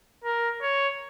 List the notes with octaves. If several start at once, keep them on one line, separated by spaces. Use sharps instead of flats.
A#4
C#5